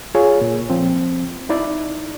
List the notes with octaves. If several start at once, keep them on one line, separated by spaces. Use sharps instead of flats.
F4 G#4 C#5
A#2
F3 C4
D#4 E4 D5